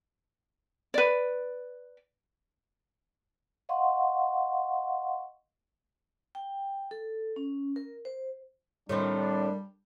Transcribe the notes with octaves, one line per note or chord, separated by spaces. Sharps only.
B4 D5
D#5 F5 F#5 C6 C#6
G5
A4
C#4
A#4
C5
A2 D#3 G3 C4 D4